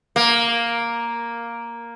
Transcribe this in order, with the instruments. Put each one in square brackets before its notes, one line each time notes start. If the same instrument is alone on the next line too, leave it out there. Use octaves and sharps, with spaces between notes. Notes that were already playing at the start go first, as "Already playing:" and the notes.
[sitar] A#3